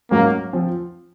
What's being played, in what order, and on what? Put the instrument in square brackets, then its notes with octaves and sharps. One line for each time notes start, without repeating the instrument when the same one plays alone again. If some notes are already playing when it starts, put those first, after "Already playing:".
[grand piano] G#2 F#3 C#4 F#4 [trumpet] A#3
[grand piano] F3 C4